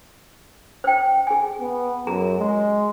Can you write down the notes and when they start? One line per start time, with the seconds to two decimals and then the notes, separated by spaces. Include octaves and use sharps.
0.84 C5 G5
1.27 G#4 G#5
1.60 B3
2.07 F#2 G#4 A#5
2.39 G#3